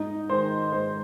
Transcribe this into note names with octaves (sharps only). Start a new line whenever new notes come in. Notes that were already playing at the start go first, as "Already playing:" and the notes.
Already playing: G#2 D#4 D#5
D#3 G#3 D#4 C5
G#2 C5